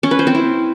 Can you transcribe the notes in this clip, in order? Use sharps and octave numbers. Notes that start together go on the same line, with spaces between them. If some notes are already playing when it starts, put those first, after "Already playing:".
C#4
B4
C5
C4
E4